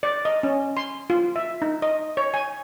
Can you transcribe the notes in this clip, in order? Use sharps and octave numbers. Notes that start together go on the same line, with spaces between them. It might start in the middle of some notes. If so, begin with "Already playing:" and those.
D5
D#5
C#4
C6
F4
E5
D#4
D#5
C#5
G#5